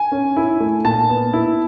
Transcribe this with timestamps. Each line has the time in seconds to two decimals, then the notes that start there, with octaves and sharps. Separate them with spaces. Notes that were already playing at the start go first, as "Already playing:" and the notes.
Already playing: G#5
0.12 C#4
0.36 E4
0.60 A3
0.85 A#2 A5
1.09 B3
1.33 E4